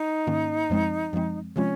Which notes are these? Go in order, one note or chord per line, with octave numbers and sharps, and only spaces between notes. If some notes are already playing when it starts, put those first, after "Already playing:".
Already playing: D#4
G#2 D#3 A#3 C#4
F#2 F3 G#3 C4
F#2 F3 G#3 C4
C3 F3 G#3 C4 C#4 F4